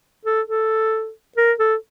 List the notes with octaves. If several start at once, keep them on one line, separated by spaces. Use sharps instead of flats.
A4
A4
A#4
A4